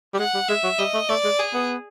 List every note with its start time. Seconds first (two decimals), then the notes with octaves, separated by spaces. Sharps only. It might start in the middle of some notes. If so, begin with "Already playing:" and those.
0.14 G3
0.19 G#3 F#5
0.34 G3
0.49 G#3 E5
0.64 F#3
0.79 G3 D#5
0.94 A3
1.09 A3 D5
1.24 G#3
1.39 G#4
1.54 B3